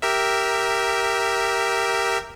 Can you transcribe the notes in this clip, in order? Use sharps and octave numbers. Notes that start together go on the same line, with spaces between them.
G4 A#4 E5